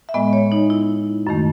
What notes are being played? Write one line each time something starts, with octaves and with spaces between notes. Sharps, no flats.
E5
A2 G#3 B3 D#5
C#5
D#4
E4
F#2 D#3 A3